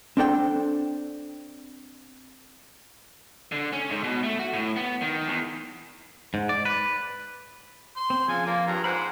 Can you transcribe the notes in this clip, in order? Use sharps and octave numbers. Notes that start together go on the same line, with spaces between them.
C4 D4 A4 G5
D3
C#4
G#2
B2
A3
F#4
A2
B3
D#3
E2
G#2
D5
B4
C6
C4
C#3 F3 G#5
A#3 D5
G2 A#5
G#2 C5 B5 F#6